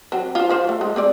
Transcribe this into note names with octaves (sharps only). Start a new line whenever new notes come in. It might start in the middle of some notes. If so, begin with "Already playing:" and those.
F#3 C4
F4 C5
F3 F4 C5
A3
G#3
C4 G#4 D5